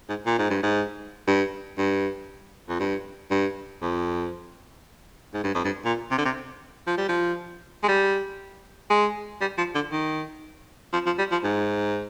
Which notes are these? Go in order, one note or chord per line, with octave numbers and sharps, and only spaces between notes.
G#2
A#2
G#2
G2
G#2
G2
G2
F2
G2
G2
F2
G#2
G2
F2
G2
A#2
C3
D3
C3
F3
G3
F3
G#3
G3
G#3
G3
F3
D3
D#3
F3
F3
G3
F3
G#2